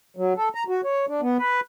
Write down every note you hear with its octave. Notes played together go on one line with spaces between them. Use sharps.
F#3
A4
A#5
F#4
C#5
D4
B3
B4